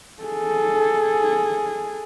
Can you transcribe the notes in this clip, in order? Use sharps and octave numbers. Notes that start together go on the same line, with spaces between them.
G#4 A4